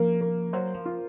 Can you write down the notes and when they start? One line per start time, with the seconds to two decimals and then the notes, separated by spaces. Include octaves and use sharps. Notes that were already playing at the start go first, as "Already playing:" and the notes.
Already playing: F3 A#3
0.21 A#3
0.53 F#3 C5
0.74 F3
0.86 F4